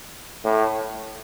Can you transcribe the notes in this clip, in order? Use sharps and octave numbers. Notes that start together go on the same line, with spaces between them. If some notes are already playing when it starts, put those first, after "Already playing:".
A2